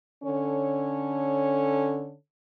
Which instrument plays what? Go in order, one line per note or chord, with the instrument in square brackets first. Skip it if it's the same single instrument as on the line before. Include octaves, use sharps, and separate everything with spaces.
[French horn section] D3 C#4 A4 C#5